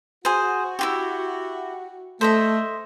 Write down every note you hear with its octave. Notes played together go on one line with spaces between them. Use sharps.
F#4 G#4 C5
E4 F4 G4
A3 C5 D#5 E5